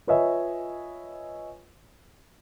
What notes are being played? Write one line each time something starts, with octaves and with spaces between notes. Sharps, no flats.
F4 B4 C#5 D#5 E5 G#5